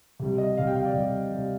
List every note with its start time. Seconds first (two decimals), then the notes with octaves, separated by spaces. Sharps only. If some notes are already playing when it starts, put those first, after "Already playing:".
0.19 C3 G3
0.38 D#5
0.57 C3 G3 F5
0.67 G5
0.76 F5
0.85 D5
0.94 C3 G3
1.32 C3 G3